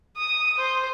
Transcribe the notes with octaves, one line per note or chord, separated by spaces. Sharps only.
D#6
C5